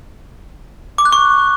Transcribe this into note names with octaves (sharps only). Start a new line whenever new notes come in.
D6
F#6
C#6